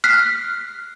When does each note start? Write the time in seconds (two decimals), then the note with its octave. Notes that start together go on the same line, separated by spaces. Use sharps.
0.04 F6 F#6 B6 C7